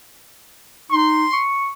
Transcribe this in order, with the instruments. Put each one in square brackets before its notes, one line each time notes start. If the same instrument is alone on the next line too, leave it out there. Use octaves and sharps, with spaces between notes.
[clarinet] D#4 [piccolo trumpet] C6
[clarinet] C#6